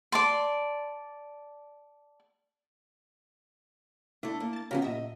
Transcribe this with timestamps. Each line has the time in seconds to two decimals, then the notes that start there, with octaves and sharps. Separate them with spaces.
0.12 D5 A5 C6
4.23 A3 D4 E4 A4
4.40 A#3
4.53 A5 A6
4.71 C#3 F3 B3 C#4 G4 A#5
4.82 A#2 D#5 E5 A#6